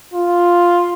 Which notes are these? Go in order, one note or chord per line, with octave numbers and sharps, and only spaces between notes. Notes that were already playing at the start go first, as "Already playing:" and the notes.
F4